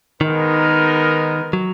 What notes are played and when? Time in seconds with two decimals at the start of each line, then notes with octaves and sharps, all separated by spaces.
0.21 D#3 G#3 B3 D#4 A#4
1.53 F#3